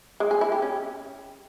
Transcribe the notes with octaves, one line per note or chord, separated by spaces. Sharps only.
G#3
G#4
E4
G4
C#4